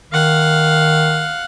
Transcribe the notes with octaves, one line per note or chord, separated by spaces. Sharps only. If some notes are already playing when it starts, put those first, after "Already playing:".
D#3 F5 F#5